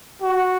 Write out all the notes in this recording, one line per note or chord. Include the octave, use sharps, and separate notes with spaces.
F#4